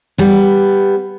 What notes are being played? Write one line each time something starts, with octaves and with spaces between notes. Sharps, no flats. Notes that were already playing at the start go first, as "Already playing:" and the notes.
G3 B3